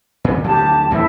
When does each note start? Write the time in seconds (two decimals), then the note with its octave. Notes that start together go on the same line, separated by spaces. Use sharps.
0.24 A#2
0.44 D2 F3 F#3 G4 A5
0.91 E2 A2 E3 E4